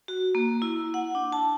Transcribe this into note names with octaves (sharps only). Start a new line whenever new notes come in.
F#4
A#3
E4
F#5
D4
A5